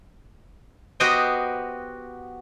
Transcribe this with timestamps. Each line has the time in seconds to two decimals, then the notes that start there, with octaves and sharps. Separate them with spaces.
1.00 B3 F#4 G4 C5 D#5 G5